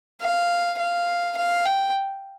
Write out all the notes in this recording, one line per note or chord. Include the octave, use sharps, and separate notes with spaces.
F5
F5
F5
G5